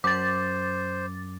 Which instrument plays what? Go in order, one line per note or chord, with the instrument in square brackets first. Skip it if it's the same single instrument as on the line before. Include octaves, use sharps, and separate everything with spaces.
[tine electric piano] F#2 [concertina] C5 [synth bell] D6 A6